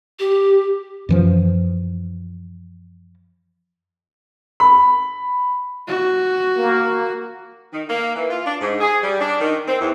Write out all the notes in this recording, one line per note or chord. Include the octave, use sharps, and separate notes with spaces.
G4
F#2 E3 F3
B5
F#4
A#3
D#3
A#3
E3
F4
D4
G#2
G#4
G3
D4
D#3
C4
E2